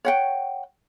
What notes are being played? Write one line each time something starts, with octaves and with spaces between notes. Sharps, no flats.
C#5 F#5 G5